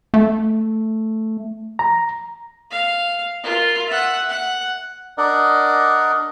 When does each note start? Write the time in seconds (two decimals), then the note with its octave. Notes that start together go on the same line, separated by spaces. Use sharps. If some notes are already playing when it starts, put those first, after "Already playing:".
0.14 A3
1.79 A#5
2.71 F5
3.43 F4 A#4
3.86 E5 F#5
4.29 F#5
5.18 D4 A#4 D5 D#5 F#5